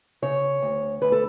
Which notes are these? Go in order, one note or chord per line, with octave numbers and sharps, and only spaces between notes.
C#3 C#5
D2
D2 B4
A4